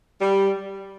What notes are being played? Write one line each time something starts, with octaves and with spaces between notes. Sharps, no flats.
G3